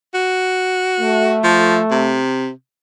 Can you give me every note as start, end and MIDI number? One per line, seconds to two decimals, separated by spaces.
0.14 1.37 66
1.00 2.19 57
1.44 1.80 53
1.91 2.50 48